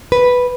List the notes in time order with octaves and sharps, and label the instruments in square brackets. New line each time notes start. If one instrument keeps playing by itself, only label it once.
[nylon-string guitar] B4